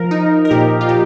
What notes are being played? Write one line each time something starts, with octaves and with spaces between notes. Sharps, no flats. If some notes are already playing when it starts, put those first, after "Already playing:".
Already playing: F3 A#4
D#4
A#4
A#2 G4
F4
A#2 G4